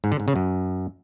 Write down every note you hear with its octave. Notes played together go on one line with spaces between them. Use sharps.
G#2
D3
G#2
C#3
F#2